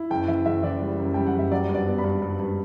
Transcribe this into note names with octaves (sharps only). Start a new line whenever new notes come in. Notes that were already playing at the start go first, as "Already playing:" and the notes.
Already playing: E4
F#1 G5
E3 E5
F#1 E5
E3 D5
G3
F#2
G3 G5
F#5
F#1
E5
F#3 D5
G2
D5
B3
B5
G2
G2
G2